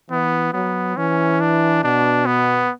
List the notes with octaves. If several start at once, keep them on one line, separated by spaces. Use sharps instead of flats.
E3 B3
F#3 B3
E3 C#4
D4
B2 D4
B3